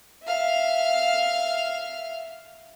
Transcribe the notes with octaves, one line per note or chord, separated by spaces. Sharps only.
E5 F5